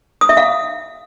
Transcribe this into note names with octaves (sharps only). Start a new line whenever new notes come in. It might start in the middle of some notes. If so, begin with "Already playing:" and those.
D#6
E5
F5